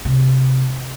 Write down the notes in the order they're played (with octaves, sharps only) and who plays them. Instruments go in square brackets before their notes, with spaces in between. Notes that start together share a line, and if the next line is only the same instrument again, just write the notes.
[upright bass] C3